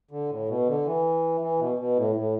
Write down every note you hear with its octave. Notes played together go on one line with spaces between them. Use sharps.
D3
A2
B2
D3
E3
E3
B2
B2
A2
A2